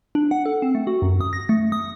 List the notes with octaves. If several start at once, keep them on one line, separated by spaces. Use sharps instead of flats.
D4
F#5
A4
C4
A3
F#4
F#2
D#6
A#6
A3
D#6